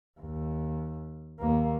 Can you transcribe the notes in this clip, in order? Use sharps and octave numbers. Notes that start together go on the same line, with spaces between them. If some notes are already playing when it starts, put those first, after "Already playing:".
D#2
D#2 A#3